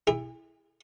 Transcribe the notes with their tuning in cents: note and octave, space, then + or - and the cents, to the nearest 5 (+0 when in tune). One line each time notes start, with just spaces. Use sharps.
E4 +0 G#4 -45